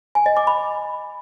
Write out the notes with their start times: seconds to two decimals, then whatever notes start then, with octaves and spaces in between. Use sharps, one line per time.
0.15 G#5
0.26 D#5
0.37 D6
0.47 B5